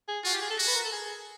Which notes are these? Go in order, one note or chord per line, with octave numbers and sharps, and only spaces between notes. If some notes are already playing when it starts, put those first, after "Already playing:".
G#4
F4 F#4
G4
G#4
A4
F#4
B4
A#4
A4
G#4